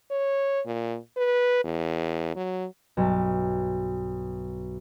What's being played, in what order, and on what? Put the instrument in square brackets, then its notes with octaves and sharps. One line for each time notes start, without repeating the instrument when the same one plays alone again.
[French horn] C#5
A#2
B4
E2
F#3
[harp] B1 G2 E5 A5